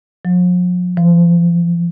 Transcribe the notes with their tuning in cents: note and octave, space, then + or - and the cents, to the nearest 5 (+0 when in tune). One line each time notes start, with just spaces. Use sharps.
F3 +45
F3 -35